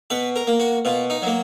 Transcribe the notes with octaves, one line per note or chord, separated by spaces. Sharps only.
B2 B4
A#4
A#3
F#4
B2 F4
D#4
F#3 A#3